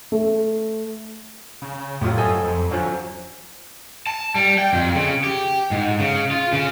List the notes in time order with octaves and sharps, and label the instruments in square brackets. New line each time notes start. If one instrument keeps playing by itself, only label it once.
[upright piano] A3
[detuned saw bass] C#3
[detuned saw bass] F2 [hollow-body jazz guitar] A2 [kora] F#3 F4 G4
[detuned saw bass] F#2 [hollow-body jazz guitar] A4 G#5 [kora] C#5 D#5
[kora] C5
[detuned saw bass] F2
[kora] D3 F3 C#4 [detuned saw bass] F#3
[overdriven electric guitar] A5
G3
G5
F2
C#3
G4
G#2
C#3
F4
C#3